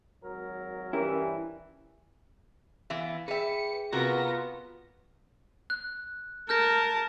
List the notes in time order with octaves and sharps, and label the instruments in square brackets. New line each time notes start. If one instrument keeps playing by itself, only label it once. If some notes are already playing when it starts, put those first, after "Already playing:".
[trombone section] G#1 F#3 A#4
[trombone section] G2 E3 [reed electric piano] C#4 G4 A#4 [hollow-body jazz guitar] E4
[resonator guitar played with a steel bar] E3 B3 E5 [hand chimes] F5
[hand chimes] G#4 G5 [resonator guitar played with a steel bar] B4 E5 [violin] C#7
[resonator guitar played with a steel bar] C3 F#4 A#4 [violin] B3 A#6 [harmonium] F4
[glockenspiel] F#6
[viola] A#4 A5 [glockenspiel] F6 G6 A#6